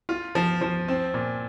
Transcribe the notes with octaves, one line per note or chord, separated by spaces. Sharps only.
F4
F3
F3
C4
A#2